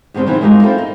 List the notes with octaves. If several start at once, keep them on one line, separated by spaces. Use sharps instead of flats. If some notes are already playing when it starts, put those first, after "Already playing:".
E2 G2 C#3 C4 D4
D#3 E3 F#3 C4 E4
G3 G#3 A#3 D#4 F4
C4 E4 F4 A4
D#4